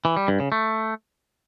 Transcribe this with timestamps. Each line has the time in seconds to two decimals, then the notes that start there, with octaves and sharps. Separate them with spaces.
0.05 E3
0.17 G3
0.28 G2
0.40 C#3
0.52 A3